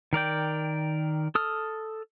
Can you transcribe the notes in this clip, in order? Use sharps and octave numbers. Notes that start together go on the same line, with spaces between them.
D#3 A#4 D5 G5
A4 D#6 F6